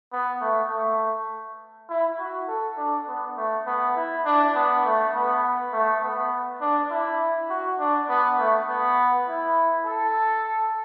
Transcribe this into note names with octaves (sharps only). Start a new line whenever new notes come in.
B3
A3
A3
E4
F#4
A4
D4
B3
A3
B3
E4
D4
B3
A3
B3
A3
B3
D4
E4
F#4
D4
B3
A3
B3
E4
A4